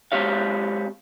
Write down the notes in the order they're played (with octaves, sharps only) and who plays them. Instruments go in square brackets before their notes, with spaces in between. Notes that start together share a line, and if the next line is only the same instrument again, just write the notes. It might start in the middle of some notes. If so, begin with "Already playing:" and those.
[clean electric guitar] G#3 C4 G4 C#5 F5